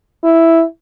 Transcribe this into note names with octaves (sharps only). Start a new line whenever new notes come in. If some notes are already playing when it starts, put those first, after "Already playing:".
E4